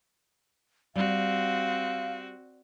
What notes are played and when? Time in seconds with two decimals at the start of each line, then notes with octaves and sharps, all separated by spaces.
0.96 G3 C4 F#4 F5